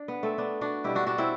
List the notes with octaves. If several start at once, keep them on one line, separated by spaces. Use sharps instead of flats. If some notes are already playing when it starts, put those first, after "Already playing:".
Already playing: D4
B3
A3 C4
B3 D4
D4 F#4
B2 G3 E4 G4
D4 F#4
D4 F#4
C4 E4